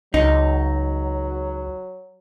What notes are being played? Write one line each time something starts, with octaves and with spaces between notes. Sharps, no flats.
C#2 F#3 D#4